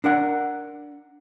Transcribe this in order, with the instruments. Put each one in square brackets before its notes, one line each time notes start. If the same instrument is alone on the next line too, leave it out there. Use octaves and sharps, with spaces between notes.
[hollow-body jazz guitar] D4 A#4 F#5